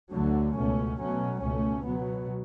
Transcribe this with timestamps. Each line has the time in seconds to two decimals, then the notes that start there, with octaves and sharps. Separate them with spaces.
0.11 D2 D3 F#3 A3
0.55 C#2 B2 A3 C#4
0.98 B2 F#3 A3 C#4
1.41 C#2 B2 A3 C#4
1.85 B2 F#3 B3